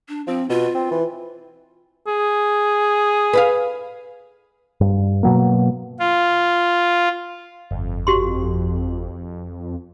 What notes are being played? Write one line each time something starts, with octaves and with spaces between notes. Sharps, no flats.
D4
F3 C4
B2 F4
C4
E3
G#4
B4 E5 F5
G2
B2 F#3 A#3
F4
G1 F2
F#4 G4 C6